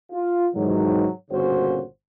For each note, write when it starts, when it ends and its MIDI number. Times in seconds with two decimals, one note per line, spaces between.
0.12 0.47 65
0.55 1.08 44
0.55 1.08 48
0.55 1.08 51
0.55 1.08 52
0.55 1.08 54
1.31 1.82 31
1.31 1.82 46
1.31 1.82 49
1.31 1.82 61
1.31 1.82 66
1.31 1.82 72